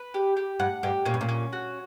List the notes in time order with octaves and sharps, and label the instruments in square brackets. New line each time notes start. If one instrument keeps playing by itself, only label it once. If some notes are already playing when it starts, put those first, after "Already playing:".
Already playing: [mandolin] B4
G4
G4
[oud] G2 [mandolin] F#5
[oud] G2 [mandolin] G4
[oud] A#2 [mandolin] C#4
[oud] G2
A#2
[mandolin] C#4
F#4